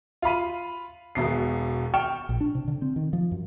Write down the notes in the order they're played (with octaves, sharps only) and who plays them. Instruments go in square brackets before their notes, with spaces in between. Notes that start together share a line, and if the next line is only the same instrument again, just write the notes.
[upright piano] F4 F5 B5 D#7
E1 B2 C7
G5 C#6 F6 E7
[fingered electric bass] A#1
D4
C3
D3
C4
D#3
F3
F#2